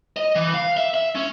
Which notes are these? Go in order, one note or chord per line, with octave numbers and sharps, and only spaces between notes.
D#5
E3
F5
E5
E5
C#4